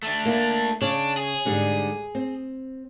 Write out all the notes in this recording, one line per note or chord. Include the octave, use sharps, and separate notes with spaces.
A3 D4
A#3 E4
C#3 D4 C#5
G#4
G#2 D3 G3
C4